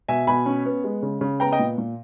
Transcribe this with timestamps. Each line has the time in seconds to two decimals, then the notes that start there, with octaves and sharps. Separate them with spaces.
0.08 B2 E5 G#5
0.27 B2 G#5 B5
0.46 C#4
0.66 B3
0.84 G#3
1.03 C#3
1.21 C#3
1.40 B3 G5 A#5
1.52 D#5 G5
1.59 A#2
1.78 A#2